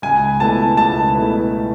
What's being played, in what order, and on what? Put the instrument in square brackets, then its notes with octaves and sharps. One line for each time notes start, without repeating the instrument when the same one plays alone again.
[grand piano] C#2 [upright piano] G#5
[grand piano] B2 A3 E4 B4 [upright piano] A5
[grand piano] C#2 [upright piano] A5
[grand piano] B2 A3 E4 B4